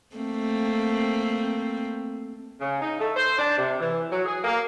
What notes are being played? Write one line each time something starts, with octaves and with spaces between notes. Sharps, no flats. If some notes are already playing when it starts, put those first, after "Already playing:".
A3 A#3 C4
C#3
D#4
A3
C5
D4
C3
E3
F#3
G#4
A#3